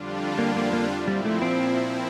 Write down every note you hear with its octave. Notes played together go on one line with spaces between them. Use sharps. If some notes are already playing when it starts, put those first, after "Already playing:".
Already playing: F2 D3 G3 D4 F4
A#3
A#3
A#3
A#2 F3 C4 E4
G3
A3
C4